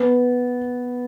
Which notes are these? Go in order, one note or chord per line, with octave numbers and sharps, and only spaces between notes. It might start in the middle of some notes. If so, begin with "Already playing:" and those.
Already playing: B3